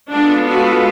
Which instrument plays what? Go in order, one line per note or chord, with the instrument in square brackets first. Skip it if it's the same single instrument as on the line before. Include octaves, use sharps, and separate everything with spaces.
[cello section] G#3 B3 F4 A4 [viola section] D4
[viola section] F#4